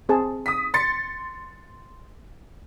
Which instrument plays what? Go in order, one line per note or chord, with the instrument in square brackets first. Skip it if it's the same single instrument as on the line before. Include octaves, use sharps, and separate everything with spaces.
[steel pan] C4 G#4 A5
[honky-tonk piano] D#6 B6
C6 A6 C#7